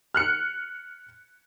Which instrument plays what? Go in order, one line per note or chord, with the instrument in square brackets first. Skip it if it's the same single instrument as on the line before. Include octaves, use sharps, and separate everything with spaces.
[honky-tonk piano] F6 F#6 C#7